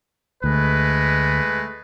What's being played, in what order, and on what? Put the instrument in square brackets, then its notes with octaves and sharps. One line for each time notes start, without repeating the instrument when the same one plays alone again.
[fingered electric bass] D2 [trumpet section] G#3 A3 B4